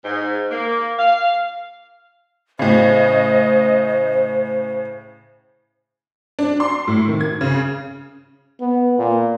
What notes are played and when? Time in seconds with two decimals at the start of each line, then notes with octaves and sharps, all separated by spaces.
0.05 G#2
0.51 A#3
0.99 F5
2.59 A2 C#3 C5 D#5
6.39 D4
6.60 C6
6.87 A2
7.08 D#3
7.21 G#6
7.41 C#3
8.60 B3
8.98 A#2